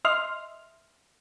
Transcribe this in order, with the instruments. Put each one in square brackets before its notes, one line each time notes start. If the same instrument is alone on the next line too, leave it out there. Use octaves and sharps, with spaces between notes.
[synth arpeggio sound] D#5 E5 C6 F6